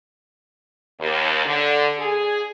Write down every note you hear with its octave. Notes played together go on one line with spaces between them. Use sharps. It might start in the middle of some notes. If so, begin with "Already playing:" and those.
D#2
D3
G#4